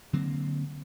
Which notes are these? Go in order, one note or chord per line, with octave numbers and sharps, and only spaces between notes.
D3 F#3 A#3 C4